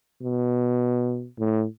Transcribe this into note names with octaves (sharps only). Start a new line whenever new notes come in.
B2
A2